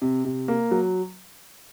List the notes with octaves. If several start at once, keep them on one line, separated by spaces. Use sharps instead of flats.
C3
C3
A#3
F#3